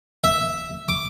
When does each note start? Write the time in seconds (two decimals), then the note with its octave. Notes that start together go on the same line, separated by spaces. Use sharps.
0.24 E5
0.89 D6